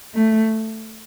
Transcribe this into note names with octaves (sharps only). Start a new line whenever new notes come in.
A3